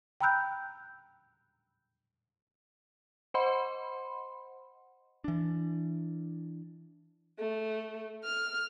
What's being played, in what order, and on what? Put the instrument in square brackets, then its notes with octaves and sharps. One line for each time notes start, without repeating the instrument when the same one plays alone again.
[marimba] G5 A#5 B5 E6 F#6 G6
[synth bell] C5 D#5 F#5 B5 C6
[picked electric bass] E3 D4
[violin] A3
F6